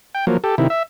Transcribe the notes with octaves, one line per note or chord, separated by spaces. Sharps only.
G5
F3 F#3 A#3
G4 A4
C3 D#3 E4
E5